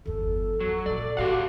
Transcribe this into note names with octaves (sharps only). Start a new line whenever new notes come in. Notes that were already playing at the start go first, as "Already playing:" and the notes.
G1 E2 A4
F3 F#3
C2 A#2 D5
D2 A2 F#4 G4 F5 F#5